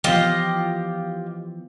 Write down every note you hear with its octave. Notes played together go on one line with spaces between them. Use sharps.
E3 F3 B3 F4 G4 D#5